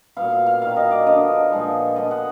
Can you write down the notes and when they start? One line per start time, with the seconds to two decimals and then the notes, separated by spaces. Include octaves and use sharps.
0.17 A#2 F#3 B3 F5
0.32 F5
0.46 F5
0.62 D#3 F#3 A#3 F5
0.76 D#5
0.91 D5
1.06 D3 F3 B3 D#5
1.51 A#2 F3 G#3 B3
1.96 D3 G#3 B3 D#5
2.11 F#5